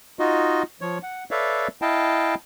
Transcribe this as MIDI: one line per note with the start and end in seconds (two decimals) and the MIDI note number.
0.19 0.63 63
0.19 0.63 65
0.19 0.63 66
0.19 0.63 75
0.81 0.98 53
0.81 0.98 73
1.03 1.24 78
1.31 1.68 69
1.31 1.68 71
1.31 1.68 73
1.31 1.68 74
1.31 1.68 76
1.31 1.68 77
1.82 2.35 64
1.82 2.35 75
1.82 2.35 77
1.82 2.35 79
1.82 2.35 81